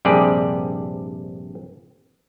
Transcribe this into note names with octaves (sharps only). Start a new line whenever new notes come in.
A#1 G2 C3 G4 G#4 D5